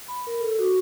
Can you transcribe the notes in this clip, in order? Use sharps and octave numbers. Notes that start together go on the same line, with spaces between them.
B5
A#4
A4
F#4